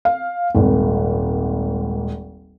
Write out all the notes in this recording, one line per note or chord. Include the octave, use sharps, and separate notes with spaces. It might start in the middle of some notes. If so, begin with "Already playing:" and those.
F5
D#1 G#1